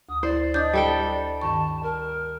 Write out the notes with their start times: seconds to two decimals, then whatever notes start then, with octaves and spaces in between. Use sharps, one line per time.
0.09 D2 D#6
0.23 E4 C5 D5
0.54 D4 D#5 D#6 G6
0.73 G3 A4 G5
1.41 G2 D#3 A5 C#6
1.83 A#4